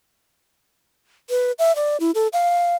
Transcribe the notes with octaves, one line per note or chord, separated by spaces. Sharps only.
B4
E5
D5
E4
A4
F5